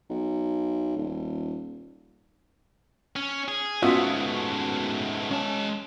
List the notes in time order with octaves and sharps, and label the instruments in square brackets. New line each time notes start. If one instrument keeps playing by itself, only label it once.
[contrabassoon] B1
D#1
[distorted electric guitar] C#4
G#4
[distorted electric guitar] G#2 A3 [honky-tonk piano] B3 C#4 F#4 [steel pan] F4 D#5 E5
[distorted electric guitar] G#3 A5 [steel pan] C#4